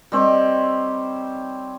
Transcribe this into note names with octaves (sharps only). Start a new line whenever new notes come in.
G3 C4 D#4 C#5